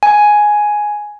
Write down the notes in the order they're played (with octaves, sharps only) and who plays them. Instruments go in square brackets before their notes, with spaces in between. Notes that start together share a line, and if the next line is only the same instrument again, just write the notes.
[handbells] G#5